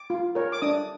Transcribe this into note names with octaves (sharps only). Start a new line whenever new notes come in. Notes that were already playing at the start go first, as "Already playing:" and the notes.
Already playing: D6
F4
A#4 C#5
D6
D4 D#6